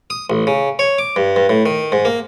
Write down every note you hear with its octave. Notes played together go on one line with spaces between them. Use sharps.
D#6
A1
C#3
C#5
D6
G2
G2
A2
D#3
G#2
A#3